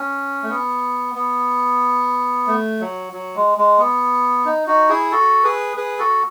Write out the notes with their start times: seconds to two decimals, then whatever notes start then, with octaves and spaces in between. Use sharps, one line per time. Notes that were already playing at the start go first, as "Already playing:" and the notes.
Already playing: C#4
0.43 A3
0.49 B3
1.15 B3
2.47 A3
2.80 F#3
3.13 F#3
3.36 G#3
3.58 G#3
3.79 B3
4.45 D#4
4.67 D#4 F#4
4.89 E4 G#4
5.12 F#4 A4
5.44 G#4 B4
5.77 G#4 B4
5.99 F#4 A4